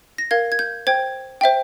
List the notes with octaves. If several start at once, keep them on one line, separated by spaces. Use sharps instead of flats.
A#6
A#4 F5 G#6
G#6
G6
C5 G5 G#6
C5 E5 G5